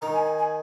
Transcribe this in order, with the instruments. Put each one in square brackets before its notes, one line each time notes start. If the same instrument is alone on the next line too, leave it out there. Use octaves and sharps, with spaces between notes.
[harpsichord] D#3 [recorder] A#5
[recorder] G#5
G#5
G#5